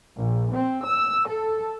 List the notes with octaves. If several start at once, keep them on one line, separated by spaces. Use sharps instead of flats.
A#1
C4
E6
A4